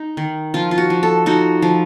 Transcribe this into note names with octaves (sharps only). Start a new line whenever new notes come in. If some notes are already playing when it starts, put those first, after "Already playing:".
Already playing: D#4
D#3
F3 F4
F4
F#4
F3
A4
D#4 F#4
F3